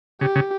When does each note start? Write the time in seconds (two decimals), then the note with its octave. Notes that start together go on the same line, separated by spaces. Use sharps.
0.21 C#3 G4
0.35 C#3